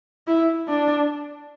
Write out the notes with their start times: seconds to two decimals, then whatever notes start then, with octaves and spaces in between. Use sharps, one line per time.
0.27 E4
0.68 D4